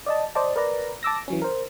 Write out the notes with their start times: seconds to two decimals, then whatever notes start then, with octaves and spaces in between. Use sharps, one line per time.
0.06 D5 D#5 A5
0.35 C5 D5 D#5 A5
0.56 A#4 B4 D5 A#5
1.03 A5 D6 E6 A#6
1.28 E3 F#3 C#4
1.42 A#4 C5